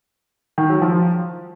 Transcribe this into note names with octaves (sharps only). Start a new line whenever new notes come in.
D#3
F#3
F3